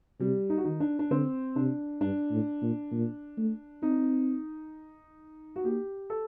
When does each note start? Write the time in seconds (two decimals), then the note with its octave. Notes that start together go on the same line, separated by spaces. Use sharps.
0.20 C3 G3
0.50 D#4
0.57 F#4
0.64 D#3 D#4
0.80 D4
0.99 D4
1.11 D3 C4
1.56 C3 D4
2.01 G2 D4
2.31 A2
2.62 A#2
2.92 A#2
3.37 A3
3.83 C4 D#4
5.56 F#4
5.64 A#3 G4
6.10 A4